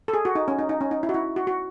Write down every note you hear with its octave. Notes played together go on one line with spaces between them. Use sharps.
A4
G#4
F#4
D#4
C#4
D#4
D#4
C#4
D#4
E4
F#4
E4
F#4
F#4